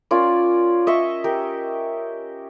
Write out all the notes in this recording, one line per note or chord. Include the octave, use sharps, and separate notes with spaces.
C#4 F4 A#4 D5
D#5 E5 C#6 D#6
G4 A#4